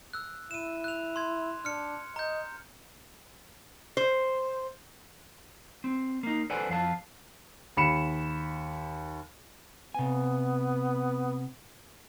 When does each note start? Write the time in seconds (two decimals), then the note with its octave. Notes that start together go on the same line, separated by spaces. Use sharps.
0.13 E6 F#6
0.51 E4 D#7 E7
0.84 F#6 F7
1.16 C6 G#6
1.65 D4 F6 C#7
2.16 D#5 A#5 G6
3.97 C5
5.84 C4
6.23 A#3 D#4
6.50 A4 B4 C5 D5 F#5 G#5
6.69 F2 F5 A5
7.77 D#2 B5 C#7 E7
9.94 C3 B3 G#5